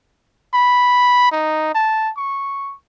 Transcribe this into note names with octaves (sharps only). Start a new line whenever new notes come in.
B5
D#4
A5
C#6